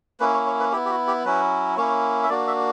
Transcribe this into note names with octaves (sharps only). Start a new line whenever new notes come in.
A#3 C#4 E4 B4
C#5
C#5
B4
B3 E4 G4
G4
F#4
G4
F#3 C#4 E4 B4
A#3 C#4 E4 C#5
E5
A#3 D4 F#4 D5
E5